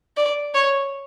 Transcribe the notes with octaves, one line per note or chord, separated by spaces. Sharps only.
D5
C#5